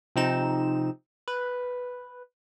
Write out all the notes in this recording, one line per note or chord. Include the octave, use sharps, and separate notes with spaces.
C3 F3 C4 D#4 E7
B4